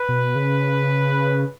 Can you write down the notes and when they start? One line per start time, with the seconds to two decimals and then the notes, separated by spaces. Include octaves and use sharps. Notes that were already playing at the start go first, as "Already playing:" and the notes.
Already playing: B4
0.09 B2
0.35 C#3